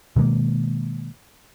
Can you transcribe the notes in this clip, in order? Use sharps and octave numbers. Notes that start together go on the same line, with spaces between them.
B2 D#3 G#3 A#3